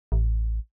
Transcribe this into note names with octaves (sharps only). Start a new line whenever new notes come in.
A1